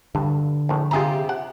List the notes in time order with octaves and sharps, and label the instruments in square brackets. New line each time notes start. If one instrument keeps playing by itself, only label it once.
[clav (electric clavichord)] G2 [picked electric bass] D3
[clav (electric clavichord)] A#1 A2
[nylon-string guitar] C3 G4 [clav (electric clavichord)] F4 G#4 A#5
[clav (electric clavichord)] F#5